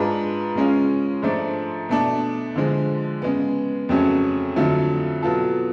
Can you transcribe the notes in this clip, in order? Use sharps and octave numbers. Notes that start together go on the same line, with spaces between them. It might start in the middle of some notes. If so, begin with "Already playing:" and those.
Already playing: G#2 G#3 D4 F4 B4
C#3 G#3 C#4 F4
G#2 F3 A3 D4
B2 A3 D4
D3 F3 G#3
C#3 G#3 B3
F2 C#3 F#3 A3 C#4
F2 D3 F#3 A3 F4
B2 F#3 B3 F4 A4